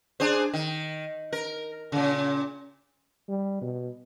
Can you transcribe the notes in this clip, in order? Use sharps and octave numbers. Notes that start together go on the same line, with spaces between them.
D4 G#4 C5
D#3
A#4
A#2 C#3
G3
B2